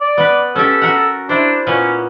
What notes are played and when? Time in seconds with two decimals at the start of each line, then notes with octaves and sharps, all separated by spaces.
0.01 D5
0.18 B3 B4
0.56 C#4 G4 A4
0.82 F#4 A#4 F#5
1.29 D4 E4 C5
1.67 A#2 A#3 B3 C#4